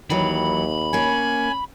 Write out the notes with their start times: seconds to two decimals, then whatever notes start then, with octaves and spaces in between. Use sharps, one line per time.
0.10 D#2 D#3 E3 F#3 B5
0.93 A#3 C#4 G#5